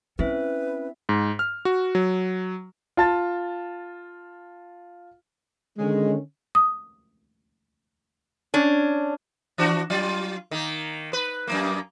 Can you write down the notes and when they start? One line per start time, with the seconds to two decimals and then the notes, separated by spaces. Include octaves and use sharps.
0.19 C4 C#4 E4 B4 E5
1.09 G#2
1.39 F6
1.65 F#4
1.95 F#3
2.97 F4 A5 A6
5.79 D3 D#3 G#3 C#4
6.55 D#6
8.54 C#4 D4
9.58 E3 D4 F#4
9.90 F#3 F4
10.51 D#3 A#3
11.13 B4
11.47 F#2 A2 A#3